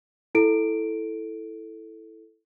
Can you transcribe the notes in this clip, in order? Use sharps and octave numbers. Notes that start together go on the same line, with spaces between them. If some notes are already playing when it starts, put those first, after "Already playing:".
E4 A4 D7